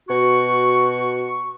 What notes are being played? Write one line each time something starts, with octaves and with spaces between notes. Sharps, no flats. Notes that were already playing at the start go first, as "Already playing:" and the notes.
B2 F#4 C#6